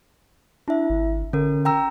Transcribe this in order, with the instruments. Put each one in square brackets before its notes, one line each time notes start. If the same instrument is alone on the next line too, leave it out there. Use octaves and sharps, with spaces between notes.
[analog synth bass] D4 [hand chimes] E4 E5
[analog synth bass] G#1
[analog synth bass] D3 [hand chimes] C#4 A#4
[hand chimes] G5 A#5 E6